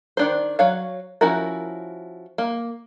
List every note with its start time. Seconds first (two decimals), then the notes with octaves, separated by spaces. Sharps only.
0.17 D#3 D4 C5
0.59 F#3 C#5 F5
1.21 F3 C#4 E4 F#4 A#4
2.38 A#3